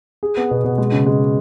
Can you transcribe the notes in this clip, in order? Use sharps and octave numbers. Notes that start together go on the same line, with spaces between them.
G#4
B3
B2
B2
G#3
C#3
G#3